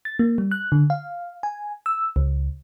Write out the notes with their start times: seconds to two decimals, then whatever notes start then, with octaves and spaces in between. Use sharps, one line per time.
0.05 A6
0.19 A#3
0.38 G3
0.51 F#6
0.72 D3
0.90 F5
1.43 G#5
1.86 E6
2.16 C#2